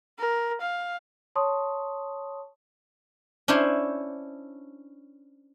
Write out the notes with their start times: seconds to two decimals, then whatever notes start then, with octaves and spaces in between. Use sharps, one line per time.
0.19 A#4
0.61 F5
1.36 C#5 A5 C6 C#6 D#6
3.48 C#4 D4 E4 C5